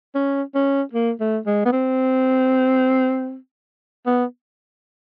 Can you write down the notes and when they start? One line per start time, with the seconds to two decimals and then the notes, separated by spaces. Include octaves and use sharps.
0.15 C#4
0.55 C#4
0.93 A#3
1.20 A3
1.46 G#3
1.65 B3
1.72 C4
4.06 B3